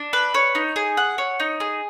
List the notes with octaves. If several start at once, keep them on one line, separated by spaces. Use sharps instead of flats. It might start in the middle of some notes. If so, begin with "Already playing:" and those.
Already playing: D4
B4
C#5
D#4
G#4
F#5
C#5
D#4
G#4